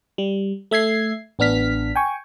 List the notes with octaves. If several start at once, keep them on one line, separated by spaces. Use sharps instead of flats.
G3
A3 E5 G#6 C7
A1 B3 D4 F6 B6
G5 G#5 C#6